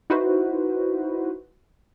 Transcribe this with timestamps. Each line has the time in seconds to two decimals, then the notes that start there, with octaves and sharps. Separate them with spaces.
0.10 D#4 E4 F#4 B4 C5